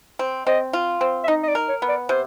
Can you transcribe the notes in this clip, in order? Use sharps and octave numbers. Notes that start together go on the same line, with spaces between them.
C4
C4 D#5
F4
C4
E5
D#4 D#5
D#5
D5
A#4
C#5
B3
D5
C3 C5